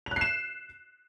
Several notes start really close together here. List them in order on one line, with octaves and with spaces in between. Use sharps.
F7 F#6 C7 E7